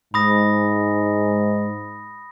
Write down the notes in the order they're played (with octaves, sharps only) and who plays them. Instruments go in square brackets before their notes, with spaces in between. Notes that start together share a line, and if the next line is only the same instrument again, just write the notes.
[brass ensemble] G#2 [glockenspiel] B5 D#6 A#6